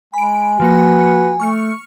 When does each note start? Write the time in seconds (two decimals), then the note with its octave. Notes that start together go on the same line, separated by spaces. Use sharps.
0.14 G#3 G#5 B5 D7
0.60 F3 A#3 F#4 B4 C#7
1.40 A3 C#6 F6 C#7